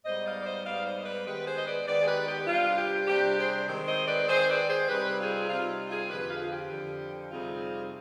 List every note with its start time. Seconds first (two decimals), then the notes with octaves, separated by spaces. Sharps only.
0.05 G#2 G3 B3 D#4 C5 D#5
0.25 D5 F5
0.41 D5
0.45 C5 D#5
0.65 G#2 G3 B3 D#4 D5 F5
0.86 C5 D#5
1.05 B4 D5
1.26 D#3 G#3 B3 G4 B4
1.46 G#4 C5
1.57 D#5
1.66 B4 D5
1.86 D#3 G#3 B3 B4 D5
2.02 G#4
2.07 G4 B4
2.27 G4
2.46 C3 G3 D4 F4
2.77 G4
3.07 C3 G3 D4 G4
3.37 G#4 C5
3.67 D#3 G#3 C4
3.87 C5 D#5
4.08 B4 D5
4.28 D#3 G#3 C4 G#4 C5
4.49 B4 D5
4.69 G#4 C5
4.88 C3 G3 C4 D#4 G4 B4
5.19 F4 G#4
5.50 C3 G3 C4 D#4 F4
5.89 F4 G#4
6.09 F2 D3 F3 G4 B4
6.30 F4 G#4
6.42 F4
6.50 G4
6.70 F2 D3 F3
7.30 F2 C3 G3 C4 D#4 F4 G#4